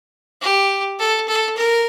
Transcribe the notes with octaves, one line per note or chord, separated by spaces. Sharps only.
G4
A4
A4
A#4